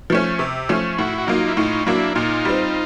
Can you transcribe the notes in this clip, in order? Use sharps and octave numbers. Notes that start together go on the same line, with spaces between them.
F3 A3 C#4
C3
F3 A3 C#4
A2 E4 F#4
F#4
F#3 A#3 D#4 F4
E4
A2 D#4 F4
F#3 A#3 D4 E4
A#2 D#4 F4
G3 C4